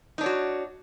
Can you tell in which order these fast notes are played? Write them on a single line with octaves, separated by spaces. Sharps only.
D#4 D4 C#5 F#4